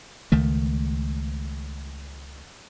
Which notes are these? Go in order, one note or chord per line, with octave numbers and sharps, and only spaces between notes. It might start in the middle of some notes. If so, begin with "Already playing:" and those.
C#2 D#3 A3